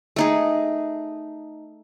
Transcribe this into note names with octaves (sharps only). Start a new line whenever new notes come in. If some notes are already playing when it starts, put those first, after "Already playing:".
A3 D#4 G#4